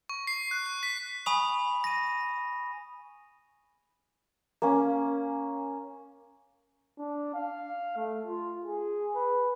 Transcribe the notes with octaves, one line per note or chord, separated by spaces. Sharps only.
C#6
C7
F#6
F#6
B6
G#5 B5 C#6 D#6 F7
A#6 D#7
A#3 C#4
D4
F5
A3
F4
G#4
B4